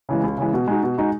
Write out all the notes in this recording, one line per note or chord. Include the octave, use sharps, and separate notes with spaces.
C#3 E3 G#3
C#2
C#3 E3 G#3
B2
G#3 D#4 F#4
B2
G#3 D#4 F#4